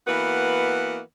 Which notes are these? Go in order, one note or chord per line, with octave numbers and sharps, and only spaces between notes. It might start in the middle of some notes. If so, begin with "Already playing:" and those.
E3 A#3 B3 F#4 B4 F#5